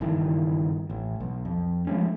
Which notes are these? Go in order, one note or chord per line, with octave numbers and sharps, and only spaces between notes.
F#1 G2 D#3 E3
A1
B1
F2
F3 G#3 A3 C#4